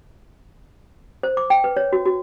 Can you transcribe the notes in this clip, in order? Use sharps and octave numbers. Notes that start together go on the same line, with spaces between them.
C5
D6
G5
B4
C#5
F#4
F#4